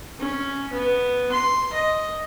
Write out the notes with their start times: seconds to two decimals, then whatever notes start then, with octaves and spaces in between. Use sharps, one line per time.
0.20 C#4
0.73 B3
1.32 C6
1.73 D#5